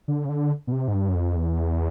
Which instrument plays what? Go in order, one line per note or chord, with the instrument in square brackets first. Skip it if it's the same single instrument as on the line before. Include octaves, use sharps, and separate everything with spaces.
[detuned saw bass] D3
C#3
D3
B2
C3
G#2
G2
F#2
F2
E2